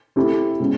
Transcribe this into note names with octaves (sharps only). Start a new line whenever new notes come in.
A3 C4 E4 G4
B2 G#3 C#4